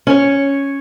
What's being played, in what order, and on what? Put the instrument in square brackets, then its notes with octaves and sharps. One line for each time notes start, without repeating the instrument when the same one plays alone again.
[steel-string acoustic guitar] C#4 C#5